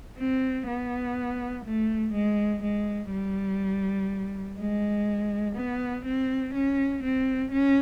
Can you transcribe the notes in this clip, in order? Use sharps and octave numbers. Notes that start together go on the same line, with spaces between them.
C4
B3
A3
G#3
G#3
G3
G#3
B3
C4
C#4
C4
C#4